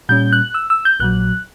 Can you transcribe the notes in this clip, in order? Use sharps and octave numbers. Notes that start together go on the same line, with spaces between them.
A#2 G3 C#4 G6
F#6
E6
E6
G6
A#1 A#2 F#3 F#6